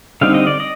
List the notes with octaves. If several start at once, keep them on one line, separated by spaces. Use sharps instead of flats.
D3 G3 C4 D#4 F5
D#5
D5
D#5